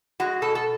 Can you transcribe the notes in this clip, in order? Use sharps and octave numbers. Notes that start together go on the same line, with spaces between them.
G#3 F#4
B2 A4
A4